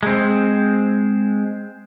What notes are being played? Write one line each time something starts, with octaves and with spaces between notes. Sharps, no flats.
G#3 C4